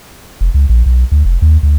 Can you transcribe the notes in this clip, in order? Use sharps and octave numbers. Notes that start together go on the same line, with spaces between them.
F1
C#2
A#1
B1
D2
F1
D#2
D2